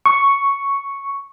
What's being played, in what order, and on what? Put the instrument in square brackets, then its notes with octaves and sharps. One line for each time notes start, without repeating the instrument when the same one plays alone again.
[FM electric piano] C#6